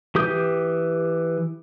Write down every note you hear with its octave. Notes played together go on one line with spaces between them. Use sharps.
E3 G4 D#6 G6